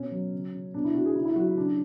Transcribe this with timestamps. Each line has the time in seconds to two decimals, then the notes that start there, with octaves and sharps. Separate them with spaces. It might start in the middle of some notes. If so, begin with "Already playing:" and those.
Already playing: B2 C#4
0.11 F#3
0.33 C#3
0.54 C#3
0.74 B2 D4
0.84 E4
0.94 B2 F#4
1.05 G#4
1.15 C#3 E4
1.25 E4
1.36 F#3 F#4
1.47 E4
1.56 C#3 D4